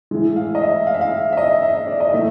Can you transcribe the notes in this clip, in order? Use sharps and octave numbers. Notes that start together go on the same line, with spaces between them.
A2 E3 G#3
F5
D#5
E5
F5
E5
F5
E5
D#5
E5
E5
D5
D#5
A2 E3 A3 E5